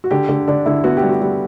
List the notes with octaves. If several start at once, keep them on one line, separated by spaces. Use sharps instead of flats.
F#4
D3 G4
D3
D3 D4
D3 E4
B3 F#4
G4
G3
F#4
G3